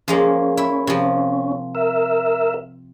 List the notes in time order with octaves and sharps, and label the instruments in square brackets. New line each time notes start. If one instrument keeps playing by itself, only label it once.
[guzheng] F3 G#3 A#3 [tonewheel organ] C#4
[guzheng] E4
C3 F3
[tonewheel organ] A#4 E5